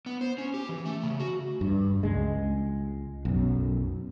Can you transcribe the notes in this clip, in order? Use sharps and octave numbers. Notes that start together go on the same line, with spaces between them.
B3
C5
C#4
G4
E3
A3
C#3
F#4
G2
C#2 G#3
B1 F#2